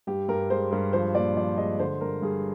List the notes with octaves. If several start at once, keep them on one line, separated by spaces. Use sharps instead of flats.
G2 G4
G2 A#4
G#3 C5
G2 A#4
F3 C5
A#2 D5
F3 D5
G#3 D#5
D3 C5
G2 A#4
G2 G#4